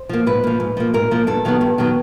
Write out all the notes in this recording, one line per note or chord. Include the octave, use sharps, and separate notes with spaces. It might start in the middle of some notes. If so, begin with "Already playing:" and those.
Already playing: C5
F3 A#3
G#2 B4
F3 A#3
G#2
F3 A#3
G#2 A#4
F3 A#3
G2 A4
D#3 F#3 B3
G2
D#3 F#3 B3